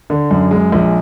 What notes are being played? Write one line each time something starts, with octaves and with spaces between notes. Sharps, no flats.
D3
F#2
G#3
A#1